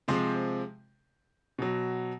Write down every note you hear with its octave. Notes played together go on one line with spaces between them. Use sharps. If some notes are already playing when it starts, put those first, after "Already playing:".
C3 F3 G#3 C5
B2 F#3